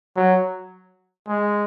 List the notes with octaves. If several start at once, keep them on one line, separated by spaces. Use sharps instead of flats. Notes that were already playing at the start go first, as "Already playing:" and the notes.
F#3
G#3